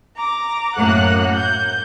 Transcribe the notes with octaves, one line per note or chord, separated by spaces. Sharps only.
A#5 D6
F#2 A2 A#3 F#5 F#6
G6